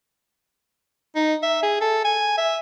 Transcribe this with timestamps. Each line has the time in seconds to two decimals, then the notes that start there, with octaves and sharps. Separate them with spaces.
1.16 D#4
1.43 E5
1.63 G#4
1.81 A4
2.05 G#5
2.38 E5